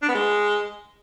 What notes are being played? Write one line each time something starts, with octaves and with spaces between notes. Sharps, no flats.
D4
B3
G#3